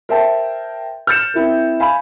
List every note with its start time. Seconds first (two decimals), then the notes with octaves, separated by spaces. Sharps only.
0.09 A#4 C5 E5 G5 A5
1.07 F6 G6 A6 C#7 E7
1.34 C4 E4 A#4
1.80 F5 G#5 B5